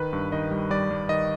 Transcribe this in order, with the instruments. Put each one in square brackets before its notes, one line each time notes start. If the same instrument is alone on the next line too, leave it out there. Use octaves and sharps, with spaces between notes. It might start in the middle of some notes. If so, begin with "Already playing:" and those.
Already playing: [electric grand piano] D#3 B4
G2
D#3 D#5
G3
G3 D5
G3
D#3 D#5